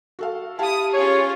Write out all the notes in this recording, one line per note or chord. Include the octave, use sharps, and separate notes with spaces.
F#4 A4 F5
E4 G4 F5 A5 D#6
C#4 F4 G#4 C#5